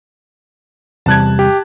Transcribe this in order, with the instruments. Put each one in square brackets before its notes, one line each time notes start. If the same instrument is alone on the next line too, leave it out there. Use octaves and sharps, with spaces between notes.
[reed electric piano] E2 C3 G3 [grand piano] A5 F#6 G#6
[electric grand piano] G4